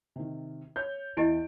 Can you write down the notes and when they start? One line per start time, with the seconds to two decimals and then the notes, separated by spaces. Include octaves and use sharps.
0.16 C3 D#3
0.76 C#5 G6
1.17 E2 E3 E4 G4 D#5 D7